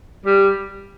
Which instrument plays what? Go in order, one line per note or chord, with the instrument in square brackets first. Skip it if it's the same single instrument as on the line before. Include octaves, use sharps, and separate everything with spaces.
[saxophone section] G3